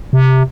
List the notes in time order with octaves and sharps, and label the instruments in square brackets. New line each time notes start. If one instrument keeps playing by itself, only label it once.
[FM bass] C3